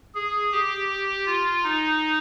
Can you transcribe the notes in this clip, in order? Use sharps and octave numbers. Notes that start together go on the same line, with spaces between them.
G#4
G4
F4
D#4